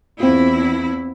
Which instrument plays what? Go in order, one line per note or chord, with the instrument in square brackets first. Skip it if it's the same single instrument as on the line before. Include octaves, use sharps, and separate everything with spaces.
[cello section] E2 E4 [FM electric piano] C4 F4